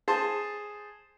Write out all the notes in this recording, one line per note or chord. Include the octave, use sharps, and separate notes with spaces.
G#4 C5 A5